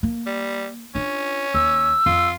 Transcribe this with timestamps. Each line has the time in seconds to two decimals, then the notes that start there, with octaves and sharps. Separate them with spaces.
0.03 A#3
0.26 G3
0.95 C#4 D4 F4
1.54 D#2 E6
2.06 F2 F4